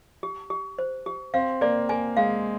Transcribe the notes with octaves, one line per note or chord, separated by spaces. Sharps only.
G4
G4
C5
G4
C4 F5
A#3 D5
A#3 G#5
G#3 F5